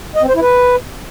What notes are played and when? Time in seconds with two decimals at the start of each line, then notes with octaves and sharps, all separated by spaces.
0.16 D#5
0.22 C4
0.29 C5
0.35 E4
0.41 B4